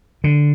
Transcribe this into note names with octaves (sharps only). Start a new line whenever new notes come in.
D3